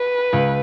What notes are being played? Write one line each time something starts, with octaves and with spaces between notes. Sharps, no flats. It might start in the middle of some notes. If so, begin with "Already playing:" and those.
Already playing: B4
C#2